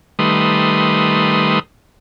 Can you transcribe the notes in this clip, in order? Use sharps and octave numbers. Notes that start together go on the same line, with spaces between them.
D#3 G3 A3 B4 C6 D#6